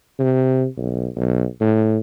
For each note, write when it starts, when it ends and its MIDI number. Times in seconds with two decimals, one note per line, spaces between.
0.19 0.66 48
0.77 1.08 35
1.16 1.45 35
1.61 1.98 45